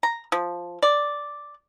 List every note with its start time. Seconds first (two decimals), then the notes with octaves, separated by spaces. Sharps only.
0.03 A#5
0.32 F3
0.82 D5